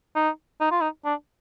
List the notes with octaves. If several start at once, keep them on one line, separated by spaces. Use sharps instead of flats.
D#4
D#4
F4
D#4
D4